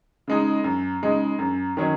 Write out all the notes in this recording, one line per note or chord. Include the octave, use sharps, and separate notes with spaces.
C#3 G#3 D#4
F#2
C#3 G#3 D#4
F#2
D#3 F#3 C#4